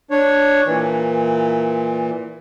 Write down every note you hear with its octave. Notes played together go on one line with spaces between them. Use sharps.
D4 C#5
A#2 E3